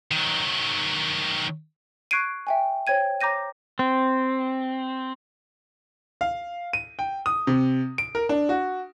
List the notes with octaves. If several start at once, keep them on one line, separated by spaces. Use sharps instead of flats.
D#3 F#3
C#6 F#6 G#6 C7 D7 D#7
E5 G5 G#5
C5 C#5 G5 G#6 D#7
C#5 A#5 D6 G6 A#6 D#7
C4
F5
D#7
G5
D#6
C3
D7
A#4
D4
F#4